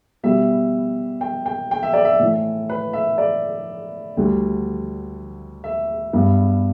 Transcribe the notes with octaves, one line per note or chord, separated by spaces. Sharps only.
B2 G3 B3 E5
G5
G5
G5
E5
D5
E5
A2 E3 A3
B4
E5
D5
D2 D3 G3
E5
G2 G3 B3